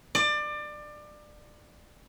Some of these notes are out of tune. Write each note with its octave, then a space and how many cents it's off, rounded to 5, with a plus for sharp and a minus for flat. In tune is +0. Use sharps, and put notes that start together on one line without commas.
D5 +25